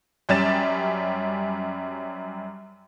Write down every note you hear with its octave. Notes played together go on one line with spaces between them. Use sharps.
F#2 G3 C#4 A6 E7